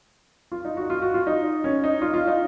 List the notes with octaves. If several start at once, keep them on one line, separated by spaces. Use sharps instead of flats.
F4
D#4
F#4
F4
F#4
F4
D#4
C#4
D#4
F4
F4
D#4